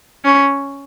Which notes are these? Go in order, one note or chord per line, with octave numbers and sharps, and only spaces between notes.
C#4